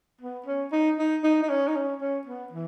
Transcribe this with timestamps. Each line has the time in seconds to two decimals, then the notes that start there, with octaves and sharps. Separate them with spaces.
0.21 B3
0.46 C#4
0.72 D#4
0.99 D#4
1.24 D#4
1.42 D#4
1.49 C#4
1.68 D#4
1.75 C#4
2.00 C#4
2.27 B3
2.52 E3